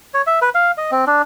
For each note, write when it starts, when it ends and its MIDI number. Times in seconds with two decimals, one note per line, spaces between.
0.14 0.22 73
0.27 0.39 76
0.42 0.50 71
0.55 0.71 77
0.78 0.91 75
0.91 1.05 60
1.07 1.22 62